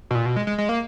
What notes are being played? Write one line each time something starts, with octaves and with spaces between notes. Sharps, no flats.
B2
A#2
B2
G#3
G#3
G#3
A#3